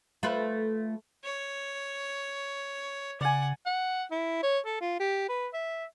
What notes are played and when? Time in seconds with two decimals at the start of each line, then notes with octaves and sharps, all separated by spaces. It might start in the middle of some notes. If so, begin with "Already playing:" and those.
0.23 A3 F4 B4
1.24 C#5
3.21 C#3 D5 F#5 G#5
3.66 F#5
4.11 E4
4.43 C#5
4.65 A4
4.81 F4
4.99 G4
5.29 B4
5.53 E5